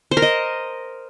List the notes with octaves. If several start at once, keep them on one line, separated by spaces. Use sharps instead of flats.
C5
A#4
D#5